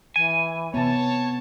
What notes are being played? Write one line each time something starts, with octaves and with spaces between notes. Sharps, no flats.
E3 G#5
C3 B3 C#5 A5